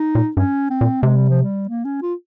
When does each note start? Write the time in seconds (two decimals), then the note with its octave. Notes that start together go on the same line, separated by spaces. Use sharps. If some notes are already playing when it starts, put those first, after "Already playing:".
Already playing: D#4
0.15 A#2
0.36 G2 C#4
0.70 C4
0.81 A#2
1.02 C3 G#3
1.16 G3
1.29 F3
1.42 G3
1.69 A#3
1.85 C#4
2.02 F4